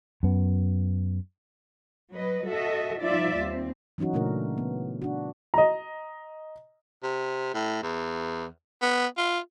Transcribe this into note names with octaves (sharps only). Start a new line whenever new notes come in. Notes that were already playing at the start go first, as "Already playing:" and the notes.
F#2 B3
F#3 B4 D#5
F#4 A4 D#5 E5
F3 G3 D#4 F4 D5 E5
D#2 C4
E3 F#3 C#4 D#4 F#4
A#2 C#3 A3 D4 A#4
B3
D4 F#4
D#5 A#5
C3
A2
E2
B3
F4